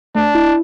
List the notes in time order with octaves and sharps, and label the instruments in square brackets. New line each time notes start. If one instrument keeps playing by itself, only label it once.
[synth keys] A3 [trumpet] D4
[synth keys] E4